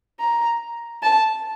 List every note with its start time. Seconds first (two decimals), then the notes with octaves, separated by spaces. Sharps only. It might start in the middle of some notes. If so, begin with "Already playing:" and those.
0.20 A#5
1.03 A5